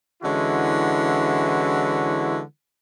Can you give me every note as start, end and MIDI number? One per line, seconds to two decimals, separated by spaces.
0.23 2.40 50
0.23 2.40 52
0.23 2.40 56
0.23 2.40 61
0.23 2.40 64
0.23 2.40 66